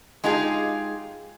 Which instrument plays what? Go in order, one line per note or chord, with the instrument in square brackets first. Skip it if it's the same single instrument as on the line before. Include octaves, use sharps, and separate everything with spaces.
[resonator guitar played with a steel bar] G#3 D#4 F4 G4 G#4